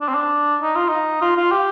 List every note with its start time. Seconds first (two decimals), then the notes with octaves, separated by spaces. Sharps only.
0.01 D4
0.08 C4
0.15 D4
0.62 D#4
0.75 F4
0.88 D#4
1.22 F4
1.37 F4
1.52 G4